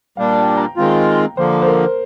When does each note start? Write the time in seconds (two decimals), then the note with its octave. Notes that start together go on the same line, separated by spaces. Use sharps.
0.17 A#2 G3 D4 F5
0.37 G5
0.57 A#5
0.77 D#3 G#3 C4 F4
1.37 D3 F3 A#3 C5
1.62 C5
1.67 A#4